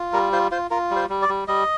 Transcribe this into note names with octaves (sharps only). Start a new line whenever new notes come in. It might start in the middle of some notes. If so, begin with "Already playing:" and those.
Already playing: F4
G3 A#4
F4 C5
F4 C5
F4 A#4
G3
C5
G3
D5
G3
G3 D#5